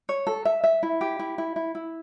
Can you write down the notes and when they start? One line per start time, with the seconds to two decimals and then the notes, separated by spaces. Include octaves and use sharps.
0.09 C#5
0.27 A4
0.45 E5
0.64 E5
0.83 E4
1.01 G4
1.19 E4
1.38 E4
1.56 E4
1.75 E4